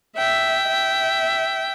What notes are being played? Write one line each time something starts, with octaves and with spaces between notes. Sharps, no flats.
E5 G5
E5